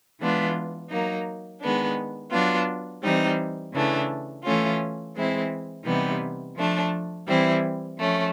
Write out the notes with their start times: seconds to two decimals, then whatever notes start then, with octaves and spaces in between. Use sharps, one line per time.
0.20 E3 G#3 B3 D4 F4
0.90 F#3 A#3 D#4
1.61 D#3 G#3 B3 D4
2.31 F#3 B3 D4 F4
3.03 E3 G3 C4 D#4
3.73 C#3 E3 A3 D4
4.43 E3 A3 C#4 F4
5.15 E3 G#3 C4 E4
5.84 C3 E3 G3 B3 D#4
6.55 F3 A3 D4
7.26 E3 G3 C4 E4
7.97 F3 A3 C#4